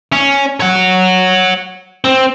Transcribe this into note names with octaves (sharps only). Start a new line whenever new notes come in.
C#4
C#5 F#5
C4